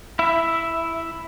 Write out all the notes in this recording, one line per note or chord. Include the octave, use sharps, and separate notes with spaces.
E4 E5